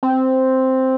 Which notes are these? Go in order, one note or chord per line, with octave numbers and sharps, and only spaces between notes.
C4